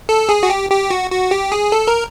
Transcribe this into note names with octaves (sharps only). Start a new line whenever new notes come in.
A4
G#4
F#4
G4
G4
F#4
F#4
G4
G#4
A4
A#4